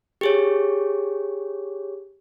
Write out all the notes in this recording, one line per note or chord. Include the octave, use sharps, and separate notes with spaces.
G4 G#4 C#5